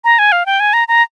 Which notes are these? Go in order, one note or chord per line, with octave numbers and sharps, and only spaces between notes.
A#5
G#5
F5
G5
G#5
A#5
A#5